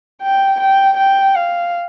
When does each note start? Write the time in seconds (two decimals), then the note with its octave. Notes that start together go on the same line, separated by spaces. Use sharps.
0.22 G5
0.60 G5
0.97 G5
1.35 F5